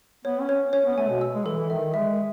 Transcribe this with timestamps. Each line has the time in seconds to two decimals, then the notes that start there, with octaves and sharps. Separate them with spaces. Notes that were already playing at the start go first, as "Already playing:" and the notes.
0.25 B3 C#5
0.41 C#4
0.49 C#5
0.73 C#4 C#5
0.85 B3
0.97 A3 G#5
1.09 B2
1.21 E6
1.34 G#3
1.46 E3 A4
1.57 E3
1.69 D#3 E5
1.94 G#3 E5